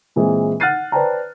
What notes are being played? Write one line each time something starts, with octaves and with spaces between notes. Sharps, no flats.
A#2 E3 G#3 C4 G#4
F#5 F6 F#6 A6 C7 D#7
B4 C5 D5 G5 A5 A#5